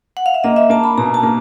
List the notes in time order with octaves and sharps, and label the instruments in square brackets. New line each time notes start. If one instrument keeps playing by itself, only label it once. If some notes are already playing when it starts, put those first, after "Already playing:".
[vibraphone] F#5
F5
E5
[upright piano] A#3 [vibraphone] D#5
[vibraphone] E5
[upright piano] A#3 [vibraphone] A5
[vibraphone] B5
[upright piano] B2 [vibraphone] A#5
[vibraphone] A5
[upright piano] A#3